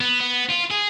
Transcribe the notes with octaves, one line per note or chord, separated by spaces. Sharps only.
B3
B3
F4
G#4